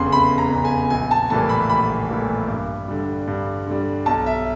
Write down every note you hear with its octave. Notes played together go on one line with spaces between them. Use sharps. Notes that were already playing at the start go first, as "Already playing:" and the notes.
Already playing: F1 E2 C#3 C6
F1 B5
A#5
E2 C#3
G#5
A#1 G#5
A5
A2 E3 G3 A#3 A5
B5
A#1 B5
A2 E3 G3 A#3
G2
D3 G3
G2
D3 G3
B1 A5
E5